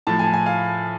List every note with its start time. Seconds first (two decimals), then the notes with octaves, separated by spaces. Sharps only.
0.07 A2 F3 A5
0.19 G#5
0.34 G#5
0.46 F5